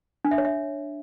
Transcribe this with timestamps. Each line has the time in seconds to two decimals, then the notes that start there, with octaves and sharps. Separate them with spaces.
0.25 D4
0.31 E5
0.38 C#5
0.45 E5